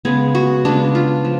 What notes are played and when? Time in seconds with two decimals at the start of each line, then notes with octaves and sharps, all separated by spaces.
0.05 C#3 G#3 B3 G#4
0.35 F#4
0.65 C#3 G#3 B3 D4
0.95 F4
1.25 F3